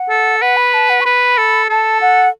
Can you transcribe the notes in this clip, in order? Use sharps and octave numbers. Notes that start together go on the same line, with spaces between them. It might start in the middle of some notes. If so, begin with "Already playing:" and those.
Already playing: F#5
A4
B4 F#5
B5
A5
F#5
C#6
B4 B5
A4
A4 A5
F#5